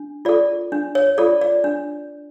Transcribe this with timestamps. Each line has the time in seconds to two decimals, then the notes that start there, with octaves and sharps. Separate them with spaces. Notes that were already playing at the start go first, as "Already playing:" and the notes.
Already playing: D4
0.25 F4 A4 D5
0.72 D4
0.95 C#5
1.18 F4 A4 D5
1.41 D5
1.64 D4